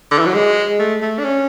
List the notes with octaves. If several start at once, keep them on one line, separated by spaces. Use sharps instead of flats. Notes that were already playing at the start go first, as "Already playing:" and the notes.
D3
E3
F#3
G#3
A3
A3
D4
C#4